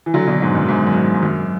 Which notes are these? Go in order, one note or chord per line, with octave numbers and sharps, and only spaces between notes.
E3
D3 F#3
B2 D3
G#2
F#2
G#2
F#2
G#2
G#2
F#2